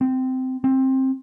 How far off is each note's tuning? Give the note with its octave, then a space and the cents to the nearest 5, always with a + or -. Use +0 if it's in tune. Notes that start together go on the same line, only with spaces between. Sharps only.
C4 -15
C4 +15